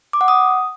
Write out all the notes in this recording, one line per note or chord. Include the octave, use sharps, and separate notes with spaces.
D6
F#5
D#6